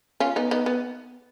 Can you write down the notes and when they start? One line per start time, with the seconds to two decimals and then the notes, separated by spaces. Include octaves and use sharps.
0.20 C#4 F4
0.36 B3 D#4
0.51 B3 D#4
0.66 B3